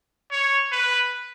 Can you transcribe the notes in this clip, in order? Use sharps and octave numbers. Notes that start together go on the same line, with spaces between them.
C#5
B4